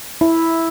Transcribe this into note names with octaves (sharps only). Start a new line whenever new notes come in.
E4